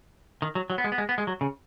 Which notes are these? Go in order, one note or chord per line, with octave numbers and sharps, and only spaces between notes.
D#3
F#3
F#3
B3
G#3
B3
G#3
B3
G#3
F#3
C#3